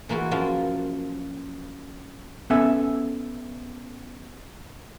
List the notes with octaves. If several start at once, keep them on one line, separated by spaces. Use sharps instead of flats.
E3 A#3 F4 F#4
F#2 F3 A#3 F4
B3 C#4 A4 E5 G#5